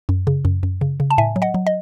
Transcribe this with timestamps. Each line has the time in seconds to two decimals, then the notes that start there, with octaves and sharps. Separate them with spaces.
0.09 F#2
0.27 C#3
0.45 F#2
0.63 F#2
0.81 C#3
1.00 C#3
1.10 A5
1.18 A2 E5 G#5
1.36 F#3
1.42 D#5 F#5
1.54 F#3
1.67 D#5